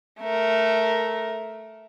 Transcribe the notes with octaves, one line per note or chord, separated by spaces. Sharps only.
A3 A#4